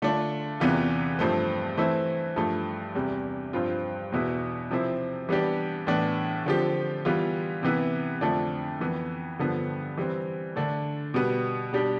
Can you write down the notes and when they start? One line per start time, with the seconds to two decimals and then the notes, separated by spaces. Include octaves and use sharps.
0.02 D3 A3 D4 F4
0.60 E2 C3 E3 B3 F4
1.19 G2 F3 A3 C4
1.78 E3 A3 C4 E4
2.36 G2 F3 A3
2.95 E2 C3 G3
3.53 G2 F3 C4 F4
4.12 E2 B2 B3 E4
4.71 C3 F3 C4 E4
5.29 E3 G3 B3 D4 G4
5.87 A2 E3 B3 D4
6.46 D3 F3 C4 G4
7.05 E3 G3 B3 F4
7.63 C3 E3 B3 E4
8.21 F2 D3 F3 A3 D4
8.80 F2 E3 B3
9.39 G2 D3 F3 B3
9.97 E3 G3 C4
10.56 D3 A3 D4
11.14 B2 G3 B3
11.73 B2 G3 D4 G4